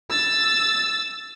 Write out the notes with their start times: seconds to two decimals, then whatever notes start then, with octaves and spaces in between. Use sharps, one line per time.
0.10 E6 A6